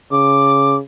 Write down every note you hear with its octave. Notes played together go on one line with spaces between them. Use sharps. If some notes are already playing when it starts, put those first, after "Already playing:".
C#3 D6